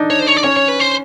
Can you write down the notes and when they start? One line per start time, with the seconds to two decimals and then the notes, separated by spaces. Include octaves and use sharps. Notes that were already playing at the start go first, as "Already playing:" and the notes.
Already playing: D4 D#4
0.10 C#5
0.19 C5
0.27 C#5
0.37 D5
0.44 C#4 C#5
0.57 C#5
0.68 B4
0.80 C5